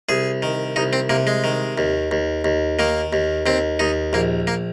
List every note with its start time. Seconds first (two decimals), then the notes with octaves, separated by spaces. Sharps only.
0.09 C2 G#4
0.42 D#3
0.76 C2 D#4
0.93 C4
1.10 C3 A#3
1.27 G#3
1.44 D#3
1.78 D#2
2.11 D#2
2.44 D#2
2.79 D#3 A#3
3.13 D#2
3.46 D#2 C4
3.79 D#2 D#4
4.13 A#1 A#3
4.47 A#3